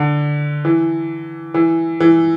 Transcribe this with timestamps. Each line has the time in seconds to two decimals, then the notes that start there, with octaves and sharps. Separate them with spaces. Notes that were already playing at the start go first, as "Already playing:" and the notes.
Already playing: D3
0.65 E3
1.54 E3
2.00 E3